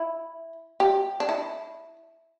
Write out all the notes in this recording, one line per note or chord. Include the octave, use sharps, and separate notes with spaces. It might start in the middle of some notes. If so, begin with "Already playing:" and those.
Already playing: E4
G4
D4
E4